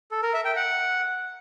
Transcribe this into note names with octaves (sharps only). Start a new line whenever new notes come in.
A4
A#4
E5
G5
F#5